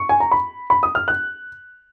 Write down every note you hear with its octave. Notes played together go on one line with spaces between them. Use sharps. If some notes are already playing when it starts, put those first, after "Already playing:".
Already playing: C#6
G#5
A#5
B5
B5
D#6
F6
F#6